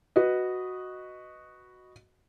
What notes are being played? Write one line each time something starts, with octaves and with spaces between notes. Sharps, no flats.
F#4 B4 D#5